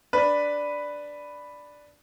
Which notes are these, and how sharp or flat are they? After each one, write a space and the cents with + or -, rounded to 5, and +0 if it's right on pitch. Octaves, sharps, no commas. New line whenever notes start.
D4 +0 B4 +0